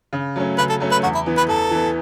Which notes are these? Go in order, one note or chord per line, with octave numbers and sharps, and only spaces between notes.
C#3
F#3 A3 C#4
C#3 B4
A4
F#3 A3 C#4
B4
E2 F#4
E4
E3 B3
B4
E2 A4
E3 B3